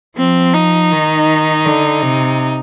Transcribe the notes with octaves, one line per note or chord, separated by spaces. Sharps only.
F3 C4
D#4
D#3
D3
C3